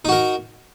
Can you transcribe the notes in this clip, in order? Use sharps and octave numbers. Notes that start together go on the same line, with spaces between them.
D#4 F#4 A#4